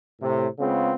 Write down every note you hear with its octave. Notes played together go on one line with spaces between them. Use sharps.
A2 C3
C#3 G#3 B3 C4 F4